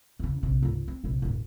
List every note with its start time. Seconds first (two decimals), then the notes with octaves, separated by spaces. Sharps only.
0.19 E2 C#3
0.43 A#1 C3
0.62 G#1 C#2
0.88 C4
1.04 A#1 C3
1.22 D#1 G#1